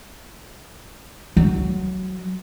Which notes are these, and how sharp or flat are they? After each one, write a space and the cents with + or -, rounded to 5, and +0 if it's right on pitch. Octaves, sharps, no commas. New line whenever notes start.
F#3 +10